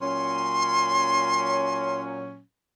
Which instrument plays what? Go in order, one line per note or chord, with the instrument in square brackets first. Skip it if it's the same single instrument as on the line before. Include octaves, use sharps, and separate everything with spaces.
[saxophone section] A#2 F#3 C#4 [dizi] C6